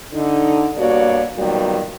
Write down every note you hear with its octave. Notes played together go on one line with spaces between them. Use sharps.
D3 D#4
G2 B2 A#3 F#4 C#5 D5
A#2 D#3 F#3 G3 B3